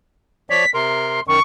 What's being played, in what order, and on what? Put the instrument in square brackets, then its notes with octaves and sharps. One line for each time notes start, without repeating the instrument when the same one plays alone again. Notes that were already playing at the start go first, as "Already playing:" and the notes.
[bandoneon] F3 C#5 D5 [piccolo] B6
[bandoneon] C3 A#4 [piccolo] C6
[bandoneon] F#2 D#3 [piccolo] C#6